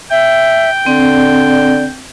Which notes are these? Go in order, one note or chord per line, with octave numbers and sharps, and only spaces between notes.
E5 G5
D3 C4 D5